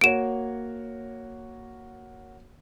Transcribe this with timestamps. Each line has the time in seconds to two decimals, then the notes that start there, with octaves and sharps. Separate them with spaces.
0.01 A#3 F#4 C#5 D7 E7